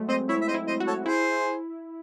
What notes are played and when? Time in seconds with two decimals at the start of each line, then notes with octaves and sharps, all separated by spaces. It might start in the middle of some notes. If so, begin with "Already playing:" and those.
Already playing: F#3 G#3 A3
0.09 C4 C5 D#5
0.29 E4 C#5 E5
0.41 E5
0.48 C5 D#5
0.54 E4
0.67 C5 D#5
0.80 F#4
0.87 A4 C#5
1.06 E4 G#4 C5